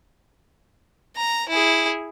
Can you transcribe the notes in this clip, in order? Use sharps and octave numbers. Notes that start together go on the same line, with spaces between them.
A#5
E4 G#4